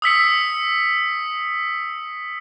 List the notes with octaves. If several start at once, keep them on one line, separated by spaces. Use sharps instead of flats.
D#6 E6 B6 C#7